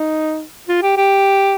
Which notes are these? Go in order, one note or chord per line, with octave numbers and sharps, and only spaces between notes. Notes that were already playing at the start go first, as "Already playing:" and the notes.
Already playing: D#4
F4
G4
G4